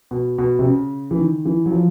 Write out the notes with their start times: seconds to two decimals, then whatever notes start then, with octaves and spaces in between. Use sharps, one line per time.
0.11 B2
0.38 B2
0.59 C3
0.64 C#3
1.11 E3
1.18 D#3
1.45 E3
1.66 F#3
1.72 F3